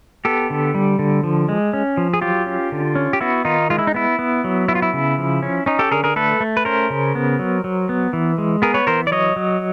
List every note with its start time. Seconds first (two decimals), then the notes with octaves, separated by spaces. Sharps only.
0.25 B3 G4 A4
0.50 D3
0.74 G3
0.99 D3
1.24 F3
1.49 G#3
1.73 C#4
1.97 F3
2.14 G#4
2.21 F#3 F4 G4
2.46 C#4
2.72 D3
2.95 C#4
3.13 G4
3.20 B3 E4 F#4
3.45 D#3 D#4 F4
3.70 G#3 F4
3.79 E4
3.87 D#4
3.94 B3 E4
4.19 B3
4.44 F#3
4.68 B3 E4
4.75 F4
4.82 E4
4.93 C#3
5.18 F3
5.43 C#4
5.66 C#4 D#4
5.79 G4 A4
5.91 D3 G#4 A#4
6.04 G#4 A#4
6.16 A3 A4 B4
6.40 A3
6.57 B4
6.65 C#4 A#4 C5
6.90 C#3
7.15 B3
7.39 F#3
7.64 F#3
7.89 B3
8.13 E3
8.38 G#3
8.62 B3 G#4 A#4
8.74 B4 C#5
8.87 E3 A#4 C5
9.07 D5
9.11 F#3 C#5 D#5
9.36 F#3